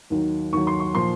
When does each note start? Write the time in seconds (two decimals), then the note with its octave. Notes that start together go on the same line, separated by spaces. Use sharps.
0.10 D#2 D#3 F#3
0.53 D#2 D#3 F#3 C#6
0.67 C6
0.80 C#6
0.95 A#2 F3 C6